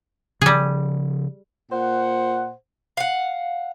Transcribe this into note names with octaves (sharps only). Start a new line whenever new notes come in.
C#3 F3 G3 G#4
A#2 C5 F#5
F5 F#5